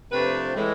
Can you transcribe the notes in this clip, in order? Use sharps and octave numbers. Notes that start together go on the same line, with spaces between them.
C3 F3 A3 D4 B4
A2 E3 G#3